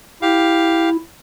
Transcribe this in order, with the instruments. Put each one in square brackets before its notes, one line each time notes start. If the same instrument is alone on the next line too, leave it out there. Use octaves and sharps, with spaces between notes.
[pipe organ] E4 [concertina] G4 F5